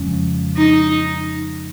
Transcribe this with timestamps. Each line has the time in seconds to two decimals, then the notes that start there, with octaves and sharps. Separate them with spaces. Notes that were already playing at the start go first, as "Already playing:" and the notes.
Already playing: F2 C#3 F3 G#3 C#4
0.57 D#4